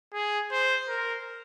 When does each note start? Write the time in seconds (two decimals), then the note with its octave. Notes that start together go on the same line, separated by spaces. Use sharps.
0.14 G#4
0.51 C5
0.88 A#4